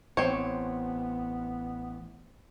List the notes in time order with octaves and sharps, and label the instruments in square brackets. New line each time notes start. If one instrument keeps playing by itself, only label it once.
[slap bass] A1 [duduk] B3 [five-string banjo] C4 C#5